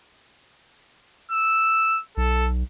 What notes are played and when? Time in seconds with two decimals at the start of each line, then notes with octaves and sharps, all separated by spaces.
1.31 E6
2.17 B1 A4